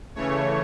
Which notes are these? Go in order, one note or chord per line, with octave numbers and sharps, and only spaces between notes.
C#3 E3 A3 C#5